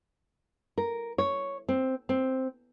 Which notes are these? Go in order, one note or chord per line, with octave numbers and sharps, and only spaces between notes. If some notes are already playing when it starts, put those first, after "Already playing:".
A#4
C#5
C4
C4